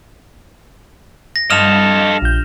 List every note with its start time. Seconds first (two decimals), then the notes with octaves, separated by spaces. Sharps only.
1.36 A#6
1.50 G2 A4 D#5 F6 E7 F7
2.22 A#1 G6